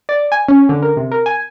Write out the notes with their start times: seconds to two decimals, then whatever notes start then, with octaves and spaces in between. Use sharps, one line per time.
0.09 D5
0.32 G#5
0.48 C#4
0.69 D3
0.82 A#4
0.97 C3
1.12 A#4
1.26 G#5